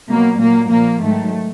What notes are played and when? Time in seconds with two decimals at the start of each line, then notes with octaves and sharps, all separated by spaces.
0.08 B2 F#3 A#3
0.39 A#2 F#3 A#3
0.69 A#2 F3 A#3
1.01 G#2 D#3 F#3 A3